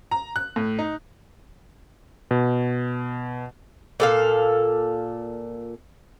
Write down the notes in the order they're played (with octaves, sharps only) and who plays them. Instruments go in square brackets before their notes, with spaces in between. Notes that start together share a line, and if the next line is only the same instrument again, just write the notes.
[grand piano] A#5
F#6
A2
D#4
[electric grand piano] B2
[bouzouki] A#2 A4 F5